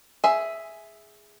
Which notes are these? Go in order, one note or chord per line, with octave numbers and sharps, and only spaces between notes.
G#4 E5